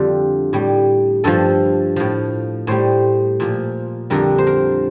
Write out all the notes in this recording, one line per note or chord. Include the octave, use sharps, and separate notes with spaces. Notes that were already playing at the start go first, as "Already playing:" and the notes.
Already playing: F2 D3 G3 F4
A2 G3
G2 F3 A4
A2 F3
A2 G3 C5
A#2 F3
F2 D3 G3 A#4
C5
A#4